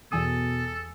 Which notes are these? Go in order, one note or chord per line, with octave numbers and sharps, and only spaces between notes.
E2 B2 A4 G#5 D#6